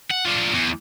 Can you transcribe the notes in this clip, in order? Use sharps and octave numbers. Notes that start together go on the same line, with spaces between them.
F#5
D4 F4
E2